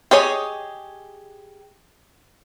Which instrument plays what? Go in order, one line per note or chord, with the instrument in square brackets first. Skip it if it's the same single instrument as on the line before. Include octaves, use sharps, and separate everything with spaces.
[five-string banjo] G4 G#4 C#5 D#5